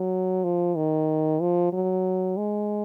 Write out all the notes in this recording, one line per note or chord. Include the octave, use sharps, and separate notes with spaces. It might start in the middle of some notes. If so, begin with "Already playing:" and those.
Already playing: F#3
F3
D#3
F3
F#3
G#3